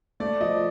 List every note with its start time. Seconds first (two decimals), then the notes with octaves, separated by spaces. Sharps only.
0.20 A3 D5
0.41 F3 D#5